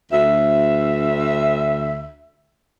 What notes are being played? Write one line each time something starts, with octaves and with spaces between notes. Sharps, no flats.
D2 E5